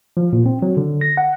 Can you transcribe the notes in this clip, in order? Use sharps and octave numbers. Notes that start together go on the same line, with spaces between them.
F3
A#2
C4
F#3
D3
A#6
F#5